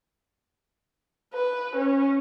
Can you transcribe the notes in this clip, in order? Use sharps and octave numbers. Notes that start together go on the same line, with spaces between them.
B4
C#4